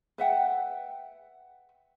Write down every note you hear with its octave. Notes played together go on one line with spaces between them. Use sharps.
B4 E5 F#5 G5